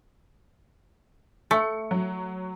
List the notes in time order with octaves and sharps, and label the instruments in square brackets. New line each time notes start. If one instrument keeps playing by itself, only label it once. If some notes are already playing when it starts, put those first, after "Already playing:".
[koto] A3 [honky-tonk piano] C#7
[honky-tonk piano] F#3